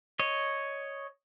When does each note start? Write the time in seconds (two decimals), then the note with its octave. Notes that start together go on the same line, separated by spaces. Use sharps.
0.19 C#5 D#5